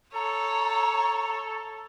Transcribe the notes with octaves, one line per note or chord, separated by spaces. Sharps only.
A4 C#5 A#5